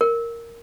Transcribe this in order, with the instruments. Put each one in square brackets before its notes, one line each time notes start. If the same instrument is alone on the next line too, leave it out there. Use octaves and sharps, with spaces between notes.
[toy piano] A#4